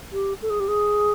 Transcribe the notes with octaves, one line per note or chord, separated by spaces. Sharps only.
G4
A4
G#4
G4
G#4